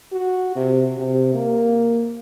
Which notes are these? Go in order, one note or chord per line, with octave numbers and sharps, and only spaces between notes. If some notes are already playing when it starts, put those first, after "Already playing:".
F#4
C3
C3
A#3